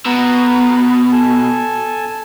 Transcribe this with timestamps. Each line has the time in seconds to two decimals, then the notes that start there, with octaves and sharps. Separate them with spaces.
0.06 B2 B4 F#5 A#5
1.12 A4 G#5 A5